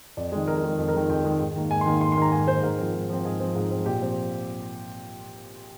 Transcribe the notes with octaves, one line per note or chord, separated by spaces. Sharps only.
F2 D5
D#3 G#3 G#4
F2 A#4
A#4
D#3 G#3
F2
A#4
D#3 G#3
F2 G5
D#3 G#3
G#2
D#3 A#3
G#2 G#5
C6
D#3 A#3
G#2 C6
C6
D#3 A#3 A#5
G#2 G#5
D#3 A#3 C5
G#2 A#4
F3 C4
G#2
F3 C4
G#2 G#4
F3 C4
G#2
F3 C4
A#2 G4
F3 C4